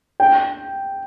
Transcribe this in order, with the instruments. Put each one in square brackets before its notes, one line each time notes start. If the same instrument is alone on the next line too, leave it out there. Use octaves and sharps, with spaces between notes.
[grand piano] G5